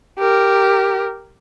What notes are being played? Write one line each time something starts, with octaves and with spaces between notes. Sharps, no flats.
G4 A#4